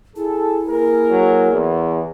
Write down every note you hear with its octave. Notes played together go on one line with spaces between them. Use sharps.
E4 G#4 A4
A#3 G#4 A#4
F#3
E2